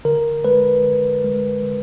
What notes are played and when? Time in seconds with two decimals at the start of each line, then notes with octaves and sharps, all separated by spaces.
0.05 D3 A#4
0.44 G#3 B4
0.84 D3
1.24 G#3
1.63 D3